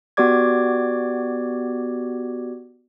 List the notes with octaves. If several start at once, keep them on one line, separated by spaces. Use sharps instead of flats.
B3 F#4 G4 D5 D6 G#6